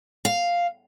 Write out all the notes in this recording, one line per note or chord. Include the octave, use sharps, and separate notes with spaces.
F5